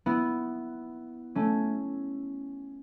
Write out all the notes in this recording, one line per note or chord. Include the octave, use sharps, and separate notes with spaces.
B3 E4
A3 C#4